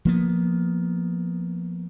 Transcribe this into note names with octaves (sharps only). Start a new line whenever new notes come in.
F3 A#3 B3